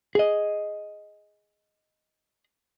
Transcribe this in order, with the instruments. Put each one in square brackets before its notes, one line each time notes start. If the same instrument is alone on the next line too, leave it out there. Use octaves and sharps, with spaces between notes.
[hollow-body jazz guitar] G#4 D#5